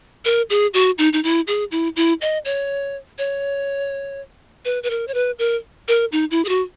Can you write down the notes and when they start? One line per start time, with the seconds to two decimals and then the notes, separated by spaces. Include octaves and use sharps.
0.25 A#4
0.50 G#4
0.74 F#4
0.98 D#4
1.13 D#4
1.24 E4
1.47 G#4
1.71 E4
1.96 E4
2.21 D#5
2.45 C#5
3.18 C#5
4.65 B4
4.83 B4
4.90 A#4
5.08 C#5
5.14 B4
5.39 A#4
5.88 A#4
6.12 D#4
6.31 E4
6.45 G#4
6.49 F#4